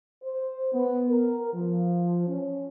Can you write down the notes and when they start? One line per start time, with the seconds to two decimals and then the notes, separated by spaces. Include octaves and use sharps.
0.23 C5
0.73 B3
1.09 A#4
1.54 F3
2.28 C#4